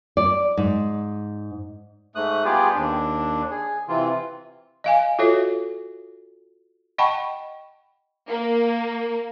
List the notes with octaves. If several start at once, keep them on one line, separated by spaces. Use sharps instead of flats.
D5
G#2
G#2 A3 D#6 F#6
G3 B3 F4 G4 G#4 D5
D#2 D4
G#4
C3 E3 F4
D#5 F5 G#5
F4 F#4 A4 C#5 E5
D#5 F#5 G5 A5 B5 C#6
A#3